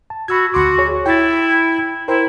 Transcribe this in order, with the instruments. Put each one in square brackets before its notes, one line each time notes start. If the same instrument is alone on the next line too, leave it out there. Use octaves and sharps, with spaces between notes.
[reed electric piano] A5
[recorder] F#4 [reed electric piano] B5 E6 G#6
[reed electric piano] D2 C6 D6 [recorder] F#4
[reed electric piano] G#4 C#5
[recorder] E4 [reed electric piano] G5 A6
[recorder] E4 [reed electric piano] A#4 C5 G5